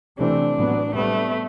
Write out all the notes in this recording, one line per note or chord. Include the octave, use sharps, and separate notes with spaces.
C3 E3 A3 C4 D4
A2 F#3 B3
C3 G3 A3 B3